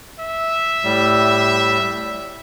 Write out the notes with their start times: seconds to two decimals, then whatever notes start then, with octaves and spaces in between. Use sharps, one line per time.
0.19 E5
0.84 A2 G3